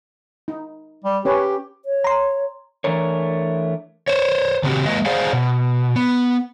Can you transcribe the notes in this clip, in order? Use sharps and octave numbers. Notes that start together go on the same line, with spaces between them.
D#4
G3
C#4 G4 B4 C#5
C#5
A#5 C6
E3 A3 D4 A#4 C#5
C5 C#5
C#3 C4 E4 F#4 G4
G#3 A#3 B4 D#5
G#4 C5 D5 F5 F#5
B2
B3